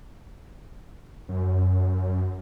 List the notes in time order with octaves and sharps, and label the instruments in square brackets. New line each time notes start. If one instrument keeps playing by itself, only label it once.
[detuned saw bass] F#2